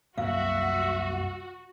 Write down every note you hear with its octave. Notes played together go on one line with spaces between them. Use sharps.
C2 F#2 A#3 F#4 E5 F5